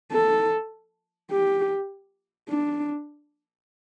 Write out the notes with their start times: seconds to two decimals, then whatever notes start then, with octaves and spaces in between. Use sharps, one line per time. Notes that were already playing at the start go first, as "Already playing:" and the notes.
0.12 A4
1.31 G4
2.49 D4